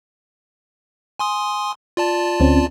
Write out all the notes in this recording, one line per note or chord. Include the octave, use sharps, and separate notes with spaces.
G#5 C6 D#6
F4 D5 A5
D2 C4 C#4